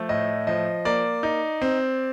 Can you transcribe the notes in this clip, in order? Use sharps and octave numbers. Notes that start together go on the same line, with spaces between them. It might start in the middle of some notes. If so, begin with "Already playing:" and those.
Already playing: F3 A3
A2 D#5
F3 D#5
A#3 D5
D#4
C4